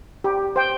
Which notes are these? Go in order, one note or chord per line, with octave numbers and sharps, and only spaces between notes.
G4
C5 G5